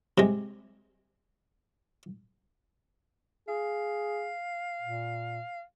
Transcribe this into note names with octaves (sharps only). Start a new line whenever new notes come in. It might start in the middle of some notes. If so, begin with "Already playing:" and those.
C3 G#3
G#4 F5
A#2